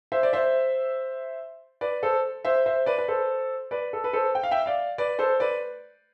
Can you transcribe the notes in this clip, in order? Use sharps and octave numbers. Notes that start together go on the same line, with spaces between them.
C5 E5
D5
C5 E5
B4 D5
A4 C5
C5 E5
C5 E5
B4 D5
B4
A4 C5
B4 D5
A4
B4
A4 C5
G5
F5
E5 G5
D5 F5
B4 D5
A4 C5
B4 D5